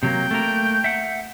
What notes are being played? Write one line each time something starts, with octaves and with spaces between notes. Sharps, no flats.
C3 F#3 A#3 G5
A3 A#3 A#4
E5 F#5